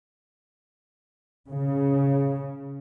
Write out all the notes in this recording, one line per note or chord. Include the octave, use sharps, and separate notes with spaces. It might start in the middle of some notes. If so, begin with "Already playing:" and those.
C#3